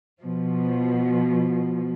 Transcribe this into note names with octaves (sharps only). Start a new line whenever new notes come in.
B2 F3